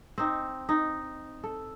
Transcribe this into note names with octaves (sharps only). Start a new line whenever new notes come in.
C4 D#4
D#4
A4